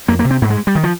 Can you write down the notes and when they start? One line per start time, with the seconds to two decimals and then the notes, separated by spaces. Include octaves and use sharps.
0.08 F2 A#3
0.19 A#3
0.25 C3
0.31 C4
0.42 G#2 A#3
0.50 G#3
0.67 G3
0.75 D#3
0.84 F3